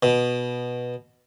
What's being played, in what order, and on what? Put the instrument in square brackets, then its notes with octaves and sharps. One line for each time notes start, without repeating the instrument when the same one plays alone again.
[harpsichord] B2